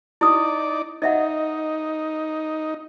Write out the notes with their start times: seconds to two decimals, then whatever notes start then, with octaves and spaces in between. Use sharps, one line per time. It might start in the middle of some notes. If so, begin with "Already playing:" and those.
0.21 D#4 E4 D5 D#6
1.02 D#4 D#5 E5 F#5